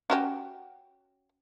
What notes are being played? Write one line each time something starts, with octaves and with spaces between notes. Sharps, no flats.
C#4 F#4 G4